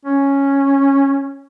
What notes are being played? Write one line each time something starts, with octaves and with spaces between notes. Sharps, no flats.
C#4